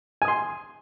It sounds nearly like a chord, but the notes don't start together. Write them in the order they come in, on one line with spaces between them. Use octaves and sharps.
G#5 D#6 C6